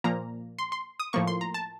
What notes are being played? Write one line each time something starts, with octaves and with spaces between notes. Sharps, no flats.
A#2 F3 A#3 A#5
C6
C6
D#6
A2 F3 A#3 C#6
C6
A#5
A5